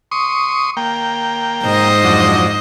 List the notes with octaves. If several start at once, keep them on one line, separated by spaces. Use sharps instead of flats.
C6 C#6 D#6
A#3 G5
G#2 C5 D#5
F2 F#3 D4